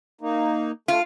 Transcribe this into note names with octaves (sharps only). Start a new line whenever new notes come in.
A#3 D#4
A3 F4